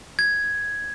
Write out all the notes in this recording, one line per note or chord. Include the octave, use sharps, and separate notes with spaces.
G#6